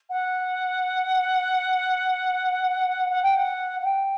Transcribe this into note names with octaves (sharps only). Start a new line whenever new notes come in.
F#5
F#5
G5
F#5
F#5
G5